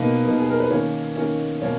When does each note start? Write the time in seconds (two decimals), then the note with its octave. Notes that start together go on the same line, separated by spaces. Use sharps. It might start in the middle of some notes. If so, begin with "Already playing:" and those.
Already playing: B2 A#3 D#4 B4
0.25 B2 A#3 D#4
0.40 G#4
0.50 A#4
0.60 B4
0.70 D#3 A#3 C#4 C#5
1.16 D#3 A#3 C#4
1.62 B2 A#3 C#4 C#5